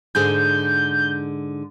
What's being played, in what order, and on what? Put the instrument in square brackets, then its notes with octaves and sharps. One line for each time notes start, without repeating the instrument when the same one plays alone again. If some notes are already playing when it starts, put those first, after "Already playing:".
[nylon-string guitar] G#2 D3 G#4 [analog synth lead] G6